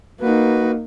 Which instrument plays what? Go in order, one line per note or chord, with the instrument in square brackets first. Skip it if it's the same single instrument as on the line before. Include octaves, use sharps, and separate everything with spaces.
[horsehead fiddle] A#3 D#4 [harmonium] F#4 B4